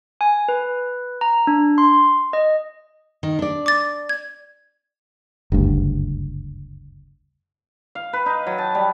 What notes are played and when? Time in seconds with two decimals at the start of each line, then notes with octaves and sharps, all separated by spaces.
0.21 G#5
0.49 B4
1.21 A#5
1.47 D4
1.78 C6
2.33 D#5
3.23 D#3
3.39 D4 D5
3.66 D6 A6
4.09 G#6
5.52 F#1 D2 G2
7.95 F5
8.13 B4
8.26 D#4
8.47 F#3
8.58 A5
8.75 G3